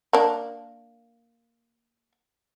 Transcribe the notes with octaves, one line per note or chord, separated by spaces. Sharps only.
A#3 D4